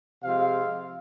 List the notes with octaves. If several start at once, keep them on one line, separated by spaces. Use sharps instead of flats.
C3 F3 G#3 C4 F5